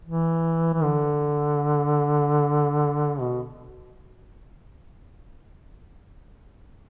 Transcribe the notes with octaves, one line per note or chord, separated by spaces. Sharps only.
E3
E3
D3
B2